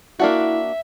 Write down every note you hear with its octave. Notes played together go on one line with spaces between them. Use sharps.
A#3 D4 E4 F#4 E5